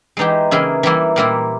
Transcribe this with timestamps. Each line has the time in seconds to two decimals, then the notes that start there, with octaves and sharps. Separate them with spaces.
0.17 E3 G#3 D#4 G4
0.51 C#3 E3 A#3 E4 G#4
0.83 E3 G3 A#3 E4
1.16 A#2 G3 A#3 E4